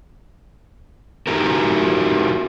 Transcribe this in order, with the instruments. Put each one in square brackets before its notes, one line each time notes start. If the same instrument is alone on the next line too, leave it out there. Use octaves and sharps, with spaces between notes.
[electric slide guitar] D#4 E4 F#4 G4 A#4